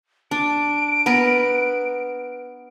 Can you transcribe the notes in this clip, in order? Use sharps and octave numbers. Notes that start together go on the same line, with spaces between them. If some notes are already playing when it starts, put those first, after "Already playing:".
D4 D7
B3 A#4 B4